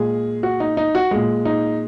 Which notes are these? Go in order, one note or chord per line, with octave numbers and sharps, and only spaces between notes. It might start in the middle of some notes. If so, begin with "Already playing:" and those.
Already playing: A#2 G#3 G#4
F#4
D#4
D#4
F#4
A#2 G#3
D#4